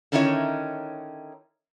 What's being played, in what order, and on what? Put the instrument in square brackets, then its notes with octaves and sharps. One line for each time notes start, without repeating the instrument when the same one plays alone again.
[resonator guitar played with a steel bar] D3 D#3 C#4 D#4 E4 C#5